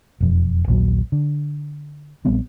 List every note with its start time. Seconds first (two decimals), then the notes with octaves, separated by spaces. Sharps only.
0.21 E1 F2
0.68 A#1 D#2 A#2 F#3
1.12 D3
2.25 A#1 G3 B3 C4